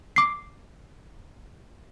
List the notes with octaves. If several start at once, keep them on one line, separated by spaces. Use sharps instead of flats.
D6 C7